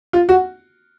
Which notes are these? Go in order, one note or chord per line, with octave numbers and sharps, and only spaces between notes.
F4
F#4